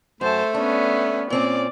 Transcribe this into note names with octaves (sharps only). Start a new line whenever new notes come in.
F#2 A3 C5 A5
B3 C#4 D4
A#2 C4 C#4 D5